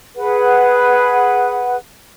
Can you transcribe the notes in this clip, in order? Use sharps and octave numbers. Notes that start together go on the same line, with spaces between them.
G#4 B4 F#5